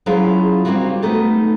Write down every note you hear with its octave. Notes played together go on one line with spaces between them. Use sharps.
F#3 C#4 E4 F4 G#4 F5
G3 A#3 C4 D#4 F4 F#4
A3 B3 D#4 A4